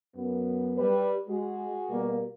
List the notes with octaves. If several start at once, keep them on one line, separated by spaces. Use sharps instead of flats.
F#2 B3
G3 B4
G#3 F#4 G#4
B2 G3 A#3